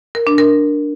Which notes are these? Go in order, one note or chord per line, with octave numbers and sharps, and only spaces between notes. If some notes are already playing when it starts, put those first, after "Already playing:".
A#4
D4
A#4